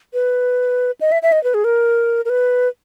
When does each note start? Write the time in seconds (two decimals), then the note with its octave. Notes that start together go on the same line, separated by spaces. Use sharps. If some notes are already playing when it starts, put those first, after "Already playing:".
0.14 B4
1.01 D#5
1.12 E5
1.22 E5
1.32 D#5
1.44 B4
1.54 G#4
1.64 A#4
2.25 A#4
2.30 B4